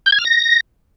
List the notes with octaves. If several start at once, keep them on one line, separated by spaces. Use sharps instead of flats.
G6
G#6
F6
A#6